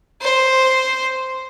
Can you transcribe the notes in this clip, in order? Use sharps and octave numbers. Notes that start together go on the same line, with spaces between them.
C5